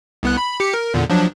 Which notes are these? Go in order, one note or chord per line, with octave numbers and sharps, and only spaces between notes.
C2 B3 F#6
B5
G4 C#7
A#4
E2 A#2 D3
F3 F#3 D4